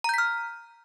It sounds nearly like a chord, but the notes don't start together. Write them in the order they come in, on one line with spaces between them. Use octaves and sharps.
A#5 G6 B6 F6